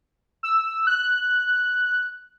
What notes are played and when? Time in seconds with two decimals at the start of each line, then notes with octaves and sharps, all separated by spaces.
0.43 E6
0.87 F#6